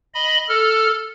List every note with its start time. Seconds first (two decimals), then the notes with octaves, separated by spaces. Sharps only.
0.14 D#5 B5
0.49 A4 F6